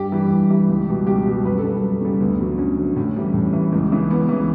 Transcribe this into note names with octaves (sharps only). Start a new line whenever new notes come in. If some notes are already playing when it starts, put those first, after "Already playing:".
Already playing: G2 G4
E3 G3
G2
E3 G3
C#2
B2 G3
C#2 G4
B2 G3 G4
F#2 B4
A4
C#3 G3
F#2
C#3 G3
D2 B3
D3 F#3
D2 C#4
D3 F#3
A2 C#4
E3 G3
A2
E3 G3
C#2
C#3 E3
C#2 B3
C#3 E3